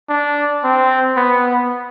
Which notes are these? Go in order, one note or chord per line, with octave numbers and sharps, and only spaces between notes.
D4
C4
B3